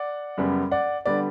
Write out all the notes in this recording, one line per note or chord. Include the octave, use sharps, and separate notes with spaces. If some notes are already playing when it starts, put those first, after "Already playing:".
Already playing: D5 F#5
F#2 C#3 G3 B3
D5 F#5
D3 G3 B3 D5